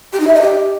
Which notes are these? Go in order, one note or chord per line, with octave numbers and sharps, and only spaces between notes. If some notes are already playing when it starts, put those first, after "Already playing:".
G4
D#4
E5
D#5
G4